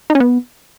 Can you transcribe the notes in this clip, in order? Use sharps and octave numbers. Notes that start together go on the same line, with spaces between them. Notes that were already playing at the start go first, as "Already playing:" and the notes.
D#4
C#4
B3